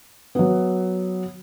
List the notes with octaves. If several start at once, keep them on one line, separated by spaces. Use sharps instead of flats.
F#3 B3